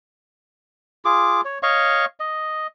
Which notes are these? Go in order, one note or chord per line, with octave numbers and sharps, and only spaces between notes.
F4 G#4 D6
C#5
C#5 D#5 F5 C#6
D#5